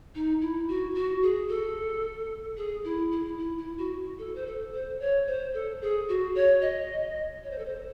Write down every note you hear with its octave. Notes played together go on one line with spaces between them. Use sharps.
D#4
E4
F#4
F#4
G#4
A4
G#4
E4
E4
E4
E4
F#4
A4
C5
A4
C5
C#5
C5
A4
G#4
F#4
C#5
D#5
C#5
C5
A4
C5